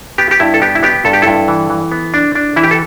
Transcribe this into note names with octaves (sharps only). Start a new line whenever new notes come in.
B3 G4
G4
G2 E4
A4
B3 G4
E4
B3 G4
G2 A4
G4
G2 E4 A4
E3
E3
B3
D4
D4
E3 E4
G4
A4